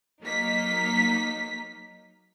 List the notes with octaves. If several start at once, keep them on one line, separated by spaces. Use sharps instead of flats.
F#3 A#3 D#4 B6